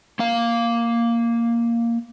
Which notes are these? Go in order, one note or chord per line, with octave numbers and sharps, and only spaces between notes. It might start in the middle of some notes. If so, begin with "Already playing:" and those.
A#3 F5